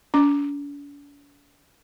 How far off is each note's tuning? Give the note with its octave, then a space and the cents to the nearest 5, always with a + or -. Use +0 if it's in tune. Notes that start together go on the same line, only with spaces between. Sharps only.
D4 -45 D6 +0